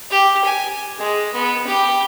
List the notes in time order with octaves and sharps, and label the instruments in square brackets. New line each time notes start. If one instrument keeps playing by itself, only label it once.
[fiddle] G4
G#5
G#3
B3
G4